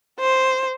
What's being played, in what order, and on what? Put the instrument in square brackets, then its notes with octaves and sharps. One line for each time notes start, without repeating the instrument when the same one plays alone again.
[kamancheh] C5